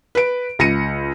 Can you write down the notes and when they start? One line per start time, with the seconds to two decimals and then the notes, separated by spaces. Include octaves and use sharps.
0.15 B4 D7
0.59 C#2 A#6 C#7 D#7